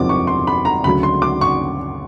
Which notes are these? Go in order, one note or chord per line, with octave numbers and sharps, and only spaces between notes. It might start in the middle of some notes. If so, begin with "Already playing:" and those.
Already playing: F#1 E2 C3 F3 D6
C#6
C6
B5
A#5
D2 C#3 F#3 B5
C6
D6
C#6